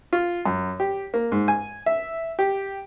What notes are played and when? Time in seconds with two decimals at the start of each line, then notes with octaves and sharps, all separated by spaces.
0.13 F4
0.46 F#2
0.80 G4
1.14 A#3
1.32 G#2
1.48 G#5
1.86 E5
2.39 G4